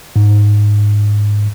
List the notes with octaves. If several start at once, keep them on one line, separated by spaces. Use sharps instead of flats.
G#2